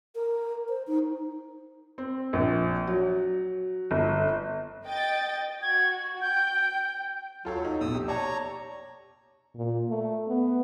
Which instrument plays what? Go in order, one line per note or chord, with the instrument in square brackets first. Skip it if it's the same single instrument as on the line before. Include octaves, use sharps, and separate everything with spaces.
[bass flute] A#4
C5
D#4
[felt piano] C4
A#1
F#3
G1
[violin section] D#5 G5 A6
[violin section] F#4 [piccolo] G#6
[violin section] G5 [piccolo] G6
[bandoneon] F#3 [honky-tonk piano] F4 A4 C#5
[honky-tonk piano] D#4
[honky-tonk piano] A#1 B2 [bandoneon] D#6 E6
[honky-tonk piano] G4
[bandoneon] C#5 A#5 C#6 [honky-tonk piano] D5 A5
[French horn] A#2
A3
B3